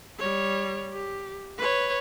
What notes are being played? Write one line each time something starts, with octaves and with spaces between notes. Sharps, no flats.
G3 C#5
G4
B4 C#5